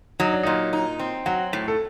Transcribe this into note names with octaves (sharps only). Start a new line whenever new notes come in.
F#3 D#4
D4
A#2 D#4
D#4
C4
F#3 F#4
A2
A4